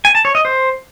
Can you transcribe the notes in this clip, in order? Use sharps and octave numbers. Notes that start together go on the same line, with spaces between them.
G#5
A5
C#5
D#5
C5